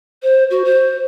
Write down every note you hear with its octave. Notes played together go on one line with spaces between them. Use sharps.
C5
F#4
C5